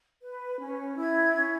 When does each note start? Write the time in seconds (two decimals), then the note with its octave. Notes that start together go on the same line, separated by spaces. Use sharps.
0.21 B4
0.59 C#4
0.97 E4 G#6
1.35 C#4